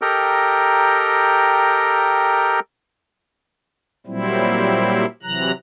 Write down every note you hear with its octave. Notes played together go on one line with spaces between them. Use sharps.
G4 A4 A#4 D#5 G5 A#5
A#2 F#3 G3 C4 E4
C3 E3 F#3 A#5 F#6